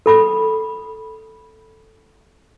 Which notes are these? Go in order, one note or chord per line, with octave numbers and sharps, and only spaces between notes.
A4 B5 D6